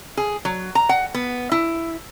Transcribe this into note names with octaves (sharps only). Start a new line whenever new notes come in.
G#4
F#3
A#5
F#5
B3
E4